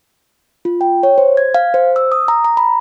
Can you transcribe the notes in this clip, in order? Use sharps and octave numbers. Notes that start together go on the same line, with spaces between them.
F4
G5
C#5
C5
G#6
F5
C5
E6
D#6
A#5
A#5
B5